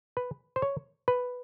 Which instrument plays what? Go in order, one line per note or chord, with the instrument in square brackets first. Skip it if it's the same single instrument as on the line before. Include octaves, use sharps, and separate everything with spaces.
[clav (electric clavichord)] B4
C5
C#5
B4